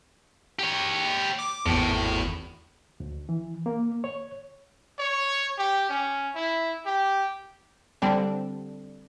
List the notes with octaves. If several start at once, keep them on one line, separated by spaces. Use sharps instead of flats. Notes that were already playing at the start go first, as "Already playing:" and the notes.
G4 C#5
D6
G#1 E2 A2
D2
E3
A#3
C#5
C#5
G4
C#4
E4
G4
D3 G3 C4 D4